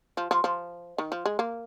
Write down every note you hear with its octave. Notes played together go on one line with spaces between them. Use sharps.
F3
F3
F3
D#3
F3
G#3
A#3